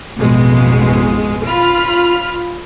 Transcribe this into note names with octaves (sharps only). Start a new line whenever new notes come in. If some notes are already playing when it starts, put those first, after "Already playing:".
A1 F2 B2 G#3
F4 B5 F6